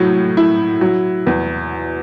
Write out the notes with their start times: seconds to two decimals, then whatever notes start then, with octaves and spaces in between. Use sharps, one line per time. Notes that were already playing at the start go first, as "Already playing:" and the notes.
Already playing: A2 F#3
0.37 E4
0.81 F#3
1.27 E2